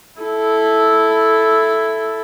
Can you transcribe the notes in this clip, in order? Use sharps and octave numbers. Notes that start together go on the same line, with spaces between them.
E4 A4